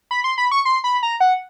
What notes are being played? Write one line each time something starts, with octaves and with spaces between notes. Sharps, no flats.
B5
C6
B5
C#6
C6
B5
A#5
F#5